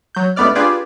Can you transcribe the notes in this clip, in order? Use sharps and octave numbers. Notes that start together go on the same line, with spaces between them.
F#3 G6
C#2 A3 B3 D4 D5 F6
D4 F4 G4 G#4 B4 D5